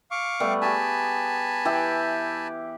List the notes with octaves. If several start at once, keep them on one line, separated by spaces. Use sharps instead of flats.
F5 C#6 D6
G3 A3 B3
G4 G#4 G#5 A5 B5
E3 G4 E5